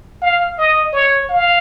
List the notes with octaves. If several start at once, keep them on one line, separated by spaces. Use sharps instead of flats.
F5
D#5
C#5
F5